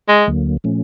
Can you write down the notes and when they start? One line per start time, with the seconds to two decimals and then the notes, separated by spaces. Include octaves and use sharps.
0.08 G#3
0.27 D2 D3 F#3 A#3
0.64 A#2 F3 A3 C#4